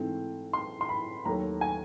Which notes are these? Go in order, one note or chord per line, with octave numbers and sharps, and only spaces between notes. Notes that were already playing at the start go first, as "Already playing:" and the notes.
Already playing: G#2 E3 A3 C4
C6
C6
B5
D#2 D#3 F#3 A3 A#5
G#5